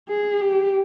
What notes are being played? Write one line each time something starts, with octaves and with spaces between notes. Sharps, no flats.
G#4
G4